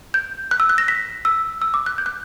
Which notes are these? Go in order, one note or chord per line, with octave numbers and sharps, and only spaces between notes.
G6
F#6
E6
F#6
A#6
B6
E6
E6
D6
F#6
G6
F#6